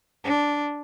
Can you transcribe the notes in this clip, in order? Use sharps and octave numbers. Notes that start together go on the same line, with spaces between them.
D4